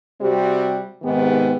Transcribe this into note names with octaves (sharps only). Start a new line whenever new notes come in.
C3 G3 C4 F#4 G4
G#2 C3 D#3 G#3 B3 G4